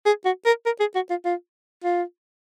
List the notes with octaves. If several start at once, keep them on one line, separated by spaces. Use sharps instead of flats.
G#4
F#4
A#4
A#4
G#4
F#4
F4
F4
F4